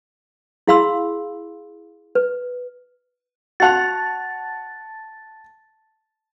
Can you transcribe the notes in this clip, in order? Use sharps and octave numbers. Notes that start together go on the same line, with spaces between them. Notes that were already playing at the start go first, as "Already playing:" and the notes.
E4 G#4 F5 B5 C6 E6
B4
F#4 F#5 A5 A6